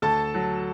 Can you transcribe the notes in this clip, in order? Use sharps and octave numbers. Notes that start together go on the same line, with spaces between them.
D2 A4 A5
F#3